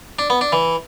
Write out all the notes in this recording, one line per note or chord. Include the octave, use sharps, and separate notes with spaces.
D4
B3
D4
E3